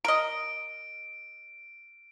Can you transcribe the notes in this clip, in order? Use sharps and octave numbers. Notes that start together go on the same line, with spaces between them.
A#4 D#5 D7